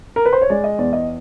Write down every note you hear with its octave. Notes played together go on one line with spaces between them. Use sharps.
A#4
B4
C5
C#5
G#3 D5
D#5
E2 D5
D#5